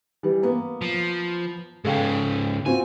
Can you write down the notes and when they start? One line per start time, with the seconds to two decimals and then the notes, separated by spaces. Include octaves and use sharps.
0.23 E3 G3
0.42 A#3 B3
0.82 F3
1.85 G#2 C#3 A4 F5 G5
2.66 C4 F4 F#4 G#5